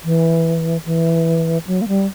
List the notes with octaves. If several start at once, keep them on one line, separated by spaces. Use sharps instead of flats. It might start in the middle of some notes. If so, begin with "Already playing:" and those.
E3
E3
F#3
A#3
G3